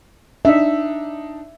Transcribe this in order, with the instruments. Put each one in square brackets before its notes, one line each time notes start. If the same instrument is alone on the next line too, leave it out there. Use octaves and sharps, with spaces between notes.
[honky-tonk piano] D4 D#4 [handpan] E5